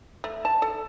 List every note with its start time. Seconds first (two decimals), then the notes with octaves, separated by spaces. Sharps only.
0.24 A3
0.45 A5
0.62 A4